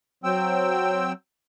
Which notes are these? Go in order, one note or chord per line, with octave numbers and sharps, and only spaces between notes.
F#3 C4 G5 E6